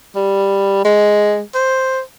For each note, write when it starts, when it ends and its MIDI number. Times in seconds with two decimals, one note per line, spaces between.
0.16 0.83 55
0.85 1.41 56
1.55 2.02 72